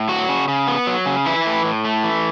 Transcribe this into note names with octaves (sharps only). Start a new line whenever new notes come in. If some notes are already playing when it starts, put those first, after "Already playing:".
Already playing: A2
F#3 F#4
C#3
C#3
B3
F#3
C#3
E3 E4
A2
A2
A3
E3